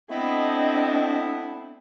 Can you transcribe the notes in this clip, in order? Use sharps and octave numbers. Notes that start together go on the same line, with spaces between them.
A3 B3 C4 D4 E4 D#5